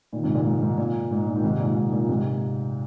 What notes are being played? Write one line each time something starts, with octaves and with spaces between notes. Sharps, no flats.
A#2 D#3
G#2 C3
A#2
G#2
G#2
A#2
G#2
A#2
D#3
G#2 C3
A#2
G#2
A#2
G#2 C3